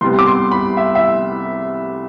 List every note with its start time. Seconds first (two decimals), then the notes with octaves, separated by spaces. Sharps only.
0.01 C2 C3 G3 B3 C6
0.19 D6
0.26 C6
0.52 B5
0.77 E5
0.95 E5